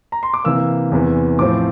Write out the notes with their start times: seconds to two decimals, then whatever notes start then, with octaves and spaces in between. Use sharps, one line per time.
0.12 A#5
0.23 C6
0.34 D6
0.44 C3 E3 A#3 E6
0.92 E2 C3 E3
1.39 A2 F3 C4 D6